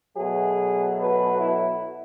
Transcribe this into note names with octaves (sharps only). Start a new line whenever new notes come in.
B2 F#3 A3 G#4
B4
E4